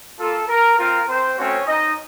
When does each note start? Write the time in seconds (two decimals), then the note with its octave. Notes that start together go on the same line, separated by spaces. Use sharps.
0.19 A#3 F4 A4
0.48 A#4
0.78 C4 F4 A#4
1.07 C4 C5
1.37 A3 C4 C#4 F#4 C#5
1.67 D#4 D#5